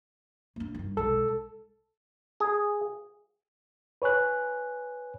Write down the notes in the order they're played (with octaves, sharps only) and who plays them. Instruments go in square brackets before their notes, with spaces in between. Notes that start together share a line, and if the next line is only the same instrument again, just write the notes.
[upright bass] A#3 D4
G2 D#3
[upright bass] B1 G#3 [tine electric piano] A4
[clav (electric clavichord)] G#4
[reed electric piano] B4 C#5 G#5 F#6